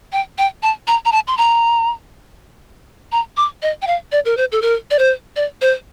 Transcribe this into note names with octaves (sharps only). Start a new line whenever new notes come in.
G5
G5
A5
A#5
A#5
A5
C6
A#5
A#5
D6
D#5
G5
F5
D5
A#4
C5
A4
A#4
D5
C5
D5
C5